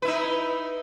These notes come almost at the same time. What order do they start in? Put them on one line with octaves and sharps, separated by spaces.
B4 E4 D#4